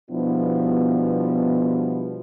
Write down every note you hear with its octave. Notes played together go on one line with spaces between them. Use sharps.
B2 F3 G3 B3 D4 E4